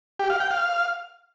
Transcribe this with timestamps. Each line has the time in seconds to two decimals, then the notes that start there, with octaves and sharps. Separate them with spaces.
0.19 G4
0.30 F5
0.40 G5
0.51 F5